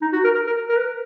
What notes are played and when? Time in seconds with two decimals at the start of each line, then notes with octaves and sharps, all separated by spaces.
0.02 D#4
0.13 F#4
0.24 A#4
0.35 A#4
0.47 A#4
0.69 A#4
0.77 B4